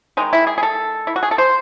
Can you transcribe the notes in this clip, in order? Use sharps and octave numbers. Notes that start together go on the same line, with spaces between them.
D#3 G#3 D#4
E4
G#4
G#4
A4
E4
F#4
G#4
A4
C5